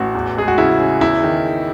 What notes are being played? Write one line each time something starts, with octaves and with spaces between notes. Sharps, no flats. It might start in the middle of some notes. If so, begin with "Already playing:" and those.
Already playing: A1 F#4
E2
G#3 G#4
F#4
C#3 E4
C#3
E2 E4
D#3